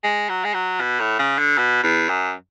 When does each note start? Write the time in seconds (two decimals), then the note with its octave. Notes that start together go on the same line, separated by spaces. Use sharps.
0.04 G#3
0.29 F#3
0.45 G#3
0.54 F#3
0.81 B2
1.00 A2
1.19 C#3
1.38 D3
1.58 B2
1.83 E2
2.09 F#2